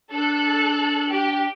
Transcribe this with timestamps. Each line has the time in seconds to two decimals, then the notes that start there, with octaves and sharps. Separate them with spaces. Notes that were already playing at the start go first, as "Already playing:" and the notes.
0.12 D4 A4 F#6
1.11 G4